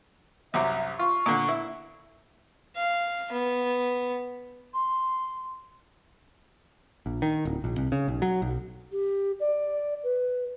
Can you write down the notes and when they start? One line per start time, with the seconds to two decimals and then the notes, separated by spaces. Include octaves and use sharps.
0.54 C2 F#2 E5 D6
0.99 F4 C#6
1.26 A#2 D3
1.49 E4
2.76 F5
3.32 B3
4.74 C6
7.06 A#1
7.22 D#3
7.45 D1
7.64 A#1
7.78 C2
7.92 C#3
8.08 B1
8.22 F#3
8.42 B1
8.92 G4
9.40 D5
10.03 B4